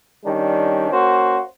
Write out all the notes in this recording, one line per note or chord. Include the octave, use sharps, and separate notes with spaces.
D#3 G3 C#4 D4
A#3 C#4 F#4 C5